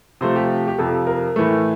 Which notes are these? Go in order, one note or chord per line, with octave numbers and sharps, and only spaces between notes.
C3 F3 A3 C5
G4
G4
F2 C3 F3 A4
A#4
A2 E3 A3